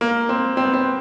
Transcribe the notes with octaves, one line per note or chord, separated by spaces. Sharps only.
A#3
C4
C4
B3
C4